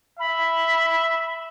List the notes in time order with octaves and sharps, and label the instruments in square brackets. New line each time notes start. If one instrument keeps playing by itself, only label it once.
[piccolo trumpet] E5 [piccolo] B5